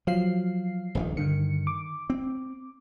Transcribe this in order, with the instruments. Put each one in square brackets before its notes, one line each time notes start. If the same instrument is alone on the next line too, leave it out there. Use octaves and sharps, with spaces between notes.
[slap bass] F3 [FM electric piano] F#3 F5 C7
[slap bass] D#1 A#1 D#3
[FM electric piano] G2 D3 C#7 [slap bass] D#3
[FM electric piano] D6
[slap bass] C4